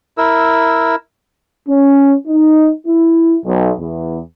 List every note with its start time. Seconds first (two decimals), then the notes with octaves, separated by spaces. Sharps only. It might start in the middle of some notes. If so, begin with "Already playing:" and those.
0.18 E4 A#4 E6
1.69 C#4
2.27 D#4
2.87 E4
3.45 B1
3.80 E2